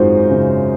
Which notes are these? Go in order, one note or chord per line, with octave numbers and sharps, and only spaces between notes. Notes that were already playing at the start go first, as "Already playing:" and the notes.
Already playing: G#1 F#2 G#3 D#4 F4 F#4 C5
C#3